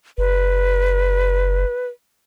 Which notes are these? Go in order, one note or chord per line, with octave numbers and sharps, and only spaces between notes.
F#1 B4